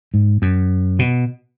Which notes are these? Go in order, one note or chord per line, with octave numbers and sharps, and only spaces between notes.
G#2
F#2
B2